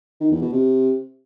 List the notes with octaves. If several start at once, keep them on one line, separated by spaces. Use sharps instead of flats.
D#3
E2
B2
C3